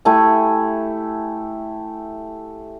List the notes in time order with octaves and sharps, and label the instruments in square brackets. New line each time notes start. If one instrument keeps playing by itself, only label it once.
[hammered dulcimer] A3 E4 G4 G#5